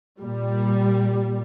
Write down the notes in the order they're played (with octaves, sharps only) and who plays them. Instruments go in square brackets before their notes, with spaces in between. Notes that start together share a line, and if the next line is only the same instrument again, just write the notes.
[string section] A#2 G3